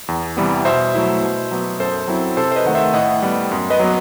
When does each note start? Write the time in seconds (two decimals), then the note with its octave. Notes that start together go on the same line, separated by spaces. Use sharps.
0.08 E2
0.37 C3 E3 G3 B3
0.65 B2 C5 E5
0.94 F#3 A3 E4
1.22 B2
1.51 F#3 B3
1.80 F#2 A4 C5
2.08 F#3 C4 E4
2.37 C3 A4 C5
2.52 C5
2.56 B4 D#5
2.65 D#3 A3 F#5
2.75 C5 E5
2.94 A2 D#5 F#5
3.22 G3 B3
3.51 F#2
3.70 B4 D#5
3.79 F#3 B3